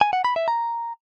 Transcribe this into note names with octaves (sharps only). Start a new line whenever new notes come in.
G#5
F#5
B5
E5
A#5